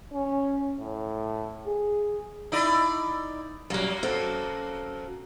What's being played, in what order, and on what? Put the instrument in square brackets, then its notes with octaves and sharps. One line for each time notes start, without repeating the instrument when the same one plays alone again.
[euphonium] C#4
A2
G#4
[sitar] D#4 E4 D5
[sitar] F#2 A#3 [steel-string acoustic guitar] F#3 G3
[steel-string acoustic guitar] C4 F#4 A4